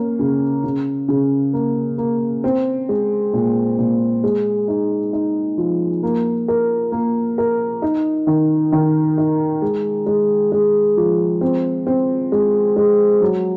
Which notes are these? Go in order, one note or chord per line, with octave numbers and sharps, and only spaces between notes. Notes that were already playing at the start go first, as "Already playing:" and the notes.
Already playing: A#3 C#4
C#3
C#3
C#3
A#3
A#3
C4
G#3
A#2
A#2
G#3
D#4
D#4
F3
A#3
A#4
A#3
A#4
D#4
D#3
D#3
D#4
G#3
G#3
G#3
F3
C4
C4
G#3
G#3
F#3